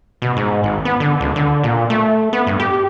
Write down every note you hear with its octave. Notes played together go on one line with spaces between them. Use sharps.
B2
G#2
G#1
B3
D3
C#2
D3
A#2
A3
B3
G2
G4